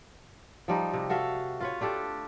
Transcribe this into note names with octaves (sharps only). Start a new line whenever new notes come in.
F3 G3 D#4
C3
F#4 A4 E5 F5
F4 B4 C#5
A3 D4 G4 A4